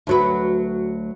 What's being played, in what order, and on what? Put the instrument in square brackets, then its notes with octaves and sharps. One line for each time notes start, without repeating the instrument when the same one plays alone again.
[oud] D2 F#3 B4